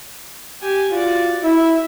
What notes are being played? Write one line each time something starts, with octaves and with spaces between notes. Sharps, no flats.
G4 G#5
F4 F#4 D5
E4 E5